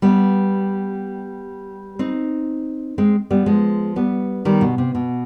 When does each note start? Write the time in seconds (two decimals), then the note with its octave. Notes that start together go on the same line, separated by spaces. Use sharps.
0.02 G3 B3
1.99 C4 D#4
2.98 G#3 C4
3.30 G3 B3
3.46 F3 G#3
3.96 G3 B3
4.45 D#3 G3
4.61 B2
4.78 C3
4.95 B2